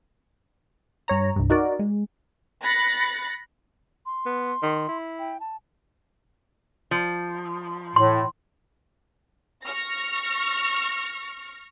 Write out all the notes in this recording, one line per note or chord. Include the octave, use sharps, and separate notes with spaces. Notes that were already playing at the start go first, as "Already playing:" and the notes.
G2 C#5 A#5
C2 G2
D#4 F#4 A#4 D5
G#3
B5 F#6 A6 A#6 C#7
C6
B3
D#3
E4
G5
A5
F3
A2 C6
C#6 F6 A#6